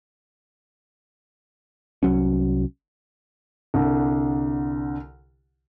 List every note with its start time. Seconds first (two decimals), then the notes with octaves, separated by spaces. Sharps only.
2.03 C2 F#3 C#4
3.74 C2 D3